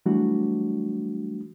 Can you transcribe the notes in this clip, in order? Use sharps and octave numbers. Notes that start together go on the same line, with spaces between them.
E3 F#3 G3 A3 D4 F#4